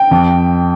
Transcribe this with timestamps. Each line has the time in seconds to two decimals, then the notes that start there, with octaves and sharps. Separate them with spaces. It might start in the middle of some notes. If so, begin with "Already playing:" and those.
Already playing: G5
0.11 F2